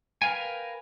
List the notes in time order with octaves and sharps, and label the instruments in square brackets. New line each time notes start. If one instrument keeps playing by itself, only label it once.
[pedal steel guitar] A#4 B4 F5 G5 G#5